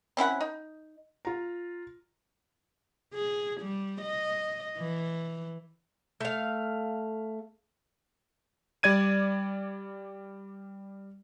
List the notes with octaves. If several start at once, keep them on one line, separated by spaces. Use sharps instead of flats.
C4 C#4 E4 F#5
D#4
F4 A#5
G#4
G3
D#5
E3
A3 F5
G3 D5 G#6 D#7